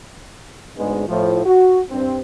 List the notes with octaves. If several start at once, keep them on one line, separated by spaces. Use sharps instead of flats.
D2 G#2 G#3 B3 D4
A2 F3
F#4
G2 C4